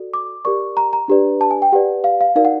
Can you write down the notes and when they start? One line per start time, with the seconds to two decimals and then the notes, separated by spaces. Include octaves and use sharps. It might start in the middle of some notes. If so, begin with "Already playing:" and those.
Already playing: F#4 A4 D5
0.14 D6
0.45 G4 A#4 D5 C#6
0.77 A#5
0.93 A#5
1.08 D4 G4 B4 D5
1.41 A5
1.51 G#5
1.62 G5
1.72 G4 B4 D5 F#5
2.04 F5
2.21 F5
2.36 D#4 F#4 A#4 D5 F5
2.45 F#5